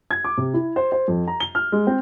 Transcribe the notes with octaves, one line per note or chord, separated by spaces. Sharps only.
G#6
D6
C3
E4
C5
C5
F2
A#5
G7
F6
G#3
C4